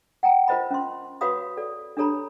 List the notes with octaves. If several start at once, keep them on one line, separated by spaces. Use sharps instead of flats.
F#5 G5 A#5
F4 A#4 C5 D#5 B5
C#4 C6
F#4 B4 C#5 F5 B5 D#6
A4 D5
D4 G4 A4 C#5 A#5 B5